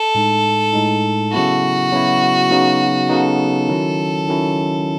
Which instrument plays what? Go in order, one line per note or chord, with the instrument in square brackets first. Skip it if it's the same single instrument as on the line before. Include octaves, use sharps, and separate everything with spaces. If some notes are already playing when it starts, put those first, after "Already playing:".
Already playing: [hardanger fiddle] A4
[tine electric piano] A2 G#3 D#4
A2 G#3 D#4
[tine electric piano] C#3 F#3 B3 E4 [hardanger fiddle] F#4
[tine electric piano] C#3 F#3 B3 E4
C#3 F#3 B3 D#4
[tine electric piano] C#3 F#3 B3 D#4 [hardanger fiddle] A4
[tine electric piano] D#3 F#3 C#4 E4
D#3 F#3 C#4 E4